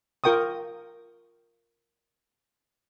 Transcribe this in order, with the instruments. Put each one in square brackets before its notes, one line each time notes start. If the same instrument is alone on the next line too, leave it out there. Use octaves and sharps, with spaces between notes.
[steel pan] F4 A#4 G5 C#6 D#6